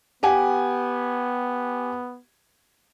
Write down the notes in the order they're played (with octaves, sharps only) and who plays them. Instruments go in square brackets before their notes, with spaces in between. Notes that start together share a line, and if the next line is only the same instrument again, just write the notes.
[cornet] B3 [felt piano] G4 F#5 G#5